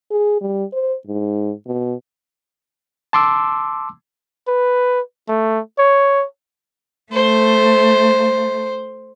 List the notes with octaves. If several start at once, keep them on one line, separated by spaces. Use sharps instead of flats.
G#4
G3
C5
G#2
B2
A5 C6 D6 E6
B4
A3
C#5
A3 C5